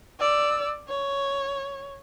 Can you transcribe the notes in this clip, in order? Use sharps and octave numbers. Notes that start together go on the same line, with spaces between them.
D5 E6
C#5